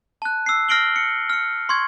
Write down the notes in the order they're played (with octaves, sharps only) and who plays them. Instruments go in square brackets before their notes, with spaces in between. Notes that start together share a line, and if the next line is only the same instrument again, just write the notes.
[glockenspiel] A5 F#6
E6 C7
F6 A#6 C7 D7 F#7 G7
C#7
F6 C#7
C6 C#6 G#6